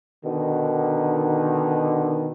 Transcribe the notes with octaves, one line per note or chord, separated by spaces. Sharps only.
B2 D3 D#3